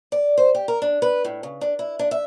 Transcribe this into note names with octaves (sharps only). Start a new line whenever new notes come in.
D5
C5
G4
A#4
D4
B4
A2
C#3
D4
E4
D4
E5